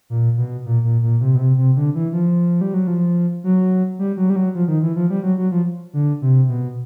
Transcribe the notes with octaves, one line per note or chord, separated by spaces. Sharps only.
A#2
B2
A#2
A#2
A#2
C3
B2
C3
C3
D3
E3
F3
G3
F#3
F3
F#3
G3
F#3
G3
F#3
F3
D#3
E3
F3
G3
F#3
F#3
F3
D3
C3
B2